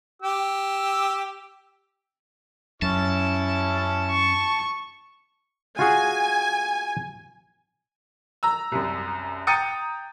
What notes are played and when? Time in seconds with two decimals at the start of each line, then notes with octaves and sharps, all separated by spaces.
0.22 G4 E6
2.82 F#2 C#4 E4 A5
4.11 C#6
5.79 F4 F#4 G#4 G#5
8.43 A#5 E6
8.72 C2 F#2
9.47 G5 A#5 D#6 A6 C#7 D#7